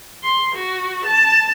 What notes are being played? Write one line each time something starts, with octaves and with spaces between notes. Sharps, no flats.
C6
F#4
A5